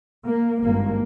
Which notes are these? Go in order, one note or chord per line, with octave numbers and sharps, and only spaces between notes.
A#3
G#1 G2 A#3